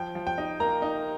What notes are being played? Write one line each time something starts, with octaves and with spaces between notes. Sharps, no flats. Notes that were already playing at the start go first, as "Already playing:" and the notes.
Already playing: F3 G5
F3
G5
D#4
A#3 A#5
D#4